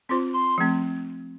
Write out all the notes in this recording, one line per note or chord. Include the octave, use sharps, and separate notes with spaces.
C4 F4 C5 C6
C6
F3 A3 C4